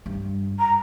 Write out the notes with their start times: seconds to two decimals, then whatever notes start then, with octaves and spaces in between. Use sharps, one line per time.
0.06 G2
0.59 A#5